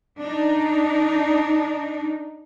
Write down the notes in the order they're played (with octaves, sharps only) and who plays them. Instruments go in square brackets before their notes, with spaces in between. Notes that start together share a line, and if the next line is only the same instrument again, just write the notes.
[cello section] D4 D#4